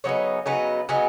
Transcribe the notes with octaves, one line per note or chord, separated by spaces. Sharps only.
C#3 F#3 B3 D#4 C#5
C#3 F#3 B3 D#4 B4
C#3 F#3 B3 D#4 G#4